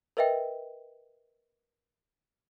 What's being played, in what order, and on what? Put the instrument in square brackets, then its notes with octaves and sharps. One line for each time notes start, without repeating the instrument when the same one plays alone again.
[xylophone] A#4 B4 D#5 E5 G5